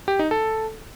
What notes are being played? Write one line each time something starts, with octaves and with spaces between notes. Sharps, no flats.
G4
D#4
A4